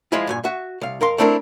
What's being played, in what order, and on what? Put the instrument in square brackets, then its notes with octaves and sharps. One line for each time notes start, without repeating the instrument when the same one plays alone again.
[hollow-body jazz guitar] F3 G#3 E4 F4
G2 A#2 G#5
F#4 E5
C2 F5
F2 A#4 F5 C6
A3 C4 D4 E4 G4 A#4